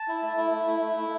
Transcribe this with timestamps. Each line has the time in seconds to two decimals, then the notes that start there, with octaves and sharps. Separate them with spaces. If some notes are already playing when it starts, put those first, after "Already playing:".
Already playing: A5
0.08 E4
0.22 A3
0.37 E4
0.52 A3
0.68 E4
0.81 A3
0.97 E4